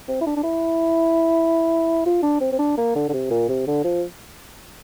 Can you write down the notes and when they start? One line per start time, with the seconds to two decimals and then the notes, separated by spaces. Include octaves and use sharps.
0.08 C4
0.21 E4
0.26 D4
0.37 D4
0.43 E4
2.06 F4
2.23 D4
2.41 C4
2.52 C4
2.59 D4
2.78 A#3
2.95 D3
3.09 D3
3.13 C3
3.31 A#2
3.49 C3
3.67 D3
3.84 F3